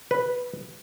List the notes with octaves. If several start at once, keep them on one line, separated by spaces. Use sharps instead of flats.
B4